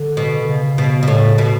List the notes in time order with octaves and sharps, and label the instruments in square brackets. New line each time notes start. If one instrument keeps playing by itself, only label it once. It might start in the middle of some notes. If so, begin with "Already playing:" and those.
Already playing: [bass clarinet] D3
[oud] B2
[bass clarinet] D3
C#3
[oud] B2
B2
A2
B2